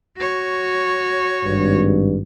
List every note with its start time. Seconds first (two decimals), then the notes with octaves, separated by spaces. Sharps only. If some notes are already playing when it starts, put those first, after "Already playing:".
0.17 F#4 C#5
1.45 G#1 G2